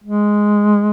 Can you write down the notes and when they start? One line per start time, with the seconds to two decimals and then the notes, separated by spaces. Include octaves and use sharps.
0.04 G#3